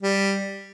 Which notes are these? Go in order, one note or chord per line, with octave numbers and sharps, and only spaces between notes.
G3